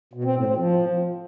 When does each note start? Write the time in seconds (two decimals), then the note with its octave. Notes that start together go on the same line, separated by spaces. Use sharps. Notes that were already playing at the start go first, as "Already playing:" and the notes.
0.13 B2
0.24 C4
0.35 A2
0.46 C4
0.57 F3